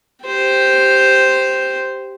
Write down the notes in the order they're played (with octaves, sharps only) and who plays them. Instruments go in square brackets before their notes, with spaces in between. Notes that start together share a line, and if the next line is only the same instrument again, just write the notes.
[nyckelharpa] G4 C5